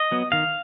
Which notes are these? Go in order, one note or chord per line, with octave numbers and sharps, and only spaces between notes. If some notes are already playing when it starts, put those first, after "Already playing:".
Already playing: D#5
F#3 B3
D#3 F5